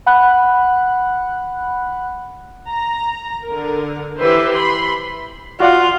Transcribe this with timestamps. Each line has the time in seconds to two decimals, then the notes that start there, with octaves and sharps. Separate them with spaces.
0.06 F#5 B5 F#6
2.69 A#5
3.46 D3 A#4
4.20 E3 G4 B4 C5 E5
4.54 B5 C6
5.60 F4 F#4 D5 F#5